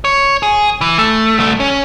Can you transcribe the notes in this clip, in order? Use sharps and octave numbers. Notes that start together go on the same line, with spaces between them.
C#5
G#4
E3
A3
C2 A3
C#4